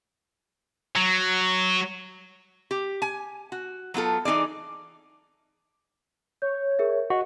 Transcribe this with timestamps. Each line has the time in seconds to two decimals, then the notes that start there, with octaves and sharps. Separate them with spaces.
0.96 F#3
2.71 G4
3.02 G#5
3.52 F#4
3.94 F#3 B3 F4 A4
4.25 E3 D#4 G#4 D5
6.42 C#5 G6
6.79 G#4 A#4 E5
7.10 F#4 D#5 F#5